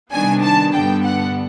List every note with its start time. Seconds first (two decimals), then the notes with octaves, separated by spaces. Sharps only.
0.12 C3 D#3 G3 B3 D4 G#5
0.42 A5
0.74 G2 D3 G3 B3 G5
1.05 F#5